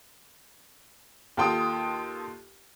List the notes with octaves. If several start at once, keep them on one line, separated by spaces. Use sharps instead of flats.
D#2 F4 A4 G5 C6 D#6